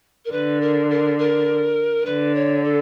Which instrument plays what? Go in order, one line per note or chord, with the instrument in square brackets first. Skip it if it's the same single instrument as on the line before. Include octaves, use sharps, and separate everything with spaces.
[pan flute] A#4
[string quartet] D3 [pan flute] B4
[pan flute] A#4
A#4
A#4
[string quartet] D3 [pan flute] B4
[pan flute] C#5
A4